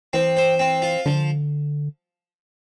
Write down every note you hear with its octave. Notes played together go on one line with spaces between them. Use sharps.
E3 C4
C5
C4
F4
D3 F3